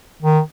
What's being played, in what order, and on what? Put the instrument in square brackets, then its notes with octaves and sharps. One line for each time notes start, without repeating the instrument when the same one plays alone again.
[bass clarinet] D#3